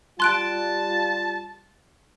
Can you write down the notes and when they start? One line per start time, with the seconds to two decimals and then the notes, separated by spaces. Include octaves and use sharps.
0.20 G3 F4 A5 C6 F#6 D7